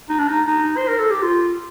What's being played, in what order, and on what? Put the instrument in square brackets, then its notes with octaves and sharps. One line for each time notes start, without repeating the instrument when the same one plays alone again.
[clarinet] D#4
D4
D#4
D#4
C5
A#4
A4
G4
F4